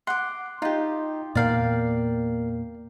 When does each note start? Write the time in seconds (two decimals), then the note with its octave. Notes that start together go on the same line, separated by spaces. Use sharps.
0.07 F#5 C6 D6
0.62 D#4 F4 G4
1.35 E2 A#2 A#3 A#4 D5 F5 G5 C7